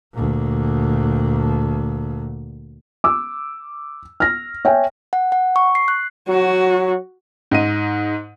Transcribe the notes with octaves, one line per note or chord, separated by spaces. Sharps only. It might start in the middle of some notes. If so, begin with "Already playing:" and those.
D2 A#2
D6 E6
F6 A#6
C#5 E5 G5 G#5
F#5
F#5
C#6
C7
F#6
F#3 F#4
G#2 D#5 D#7